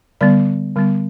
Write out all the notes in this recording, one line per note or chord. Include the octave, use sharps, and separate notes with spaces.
D3 G3 B3 D5
D3 G3 B3